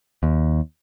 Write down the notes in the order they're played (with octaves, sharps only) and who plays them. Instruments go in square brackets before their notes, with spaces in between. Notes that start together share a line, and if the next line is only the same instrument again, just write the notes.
[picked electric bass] D#2